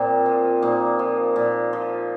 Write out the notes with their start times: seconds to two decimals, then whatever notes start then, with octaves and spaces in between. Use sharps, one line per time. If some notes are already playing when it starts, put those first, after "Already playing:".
Already playing: A#2 F3 A#3 C4
0.26 F3
0.62 A#2 A#3 D#4
0.99 F3
1.36 A#2
1.73 F3